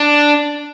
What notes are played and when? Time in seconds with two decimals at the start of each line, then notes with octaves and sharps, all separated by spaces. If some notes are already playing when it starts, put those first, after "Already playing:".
Already playing: D4